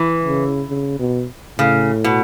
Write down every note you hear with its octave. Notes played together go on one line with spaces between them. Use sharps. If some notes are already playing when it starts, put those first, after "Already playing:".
Already playing: E3
C#3
C#3
B2
A2 C#3
B2